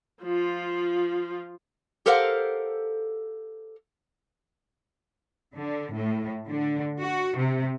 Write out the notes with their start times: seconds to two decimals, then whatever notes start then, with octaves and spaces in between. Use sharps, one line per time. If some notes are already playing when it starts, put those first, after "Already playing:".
0.22 F3 F4
2.06 G4 A4 A#4 C5 F5 F#5
5.54 D3
5.93 A2
6.48 D3
7.00 F#4
7.37 C3